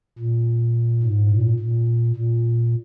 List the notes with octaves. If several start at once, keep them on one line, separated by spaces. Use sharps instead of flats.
A#2
G#2
A#2
A#2
A#2